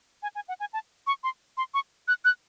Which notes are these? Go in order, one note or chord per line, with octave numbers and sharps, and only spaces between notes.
G#5
G#5
F#5
G#5
A5
C#6
C6
C6
C#6
F#6
F#6